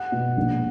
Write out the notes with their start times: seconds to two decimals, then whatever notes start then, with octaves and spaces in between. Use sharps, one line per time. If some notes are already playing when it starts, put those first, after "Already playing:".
Already playing: F#5
0.12 B2
0.37 A#1